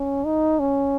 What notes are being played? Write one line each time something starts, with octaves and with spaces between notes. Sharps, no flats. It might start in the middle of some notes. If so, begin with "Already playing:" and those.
Already playing: C#4
D#4
C#4